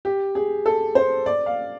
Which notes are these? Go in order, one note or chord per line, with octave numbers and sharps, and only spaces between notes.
G4
G#4
A4
C5
D5
F5